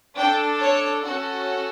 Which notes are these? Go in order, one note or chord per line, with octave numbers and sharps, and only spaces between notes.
D4 A4 G5
C#5
C#4 F#4 A4